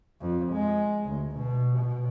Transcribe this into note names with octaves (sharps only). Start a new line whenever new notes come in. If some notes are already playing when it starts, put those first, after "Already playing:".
F2
G#3
D2
B2
B2